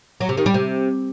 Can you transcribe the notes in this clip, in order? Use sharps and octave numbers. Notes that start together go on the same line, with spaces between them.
F#3
C3
D#3
G3
C3